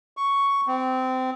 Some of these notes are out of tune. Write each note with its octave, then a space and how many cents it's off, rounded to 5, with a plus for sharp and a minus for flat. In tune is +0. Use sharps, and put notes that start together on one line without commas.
C#6 +5
C4 -20